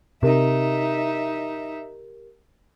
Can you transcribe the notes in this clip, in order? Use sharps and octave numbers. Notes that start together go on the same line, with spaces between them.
C3 D#4 G4 A#4 E5